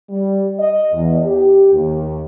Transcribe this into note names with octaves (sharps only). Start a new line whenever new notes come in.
G3
D#5
E2
G4
D#2